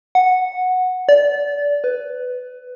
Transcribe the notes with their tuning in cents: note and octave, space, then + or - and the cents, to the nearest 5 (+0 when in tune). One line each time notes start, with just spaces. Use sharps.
F#5 -10
D5 -25
B4 +15